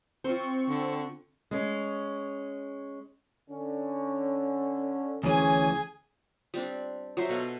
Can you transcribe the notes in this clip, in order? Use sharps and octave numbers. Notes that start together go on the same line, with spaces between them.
C4 F4 C5 C#6
D3
G#3 C#4
D3 C#4
D2 E3 C#4 G#4 G#5
G3 C4 D4 F4
F#3 F4 C5 E5
B2 A4 F5